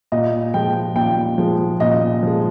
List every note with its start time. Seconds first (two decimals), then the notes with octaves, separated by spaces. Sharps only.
0.12 A#2 D#5
0.54 F3 G#3 G5
0.96 A#2 G5
1.38 F3 G#3
1.80 A#2 D#5
2.23 F3 G#3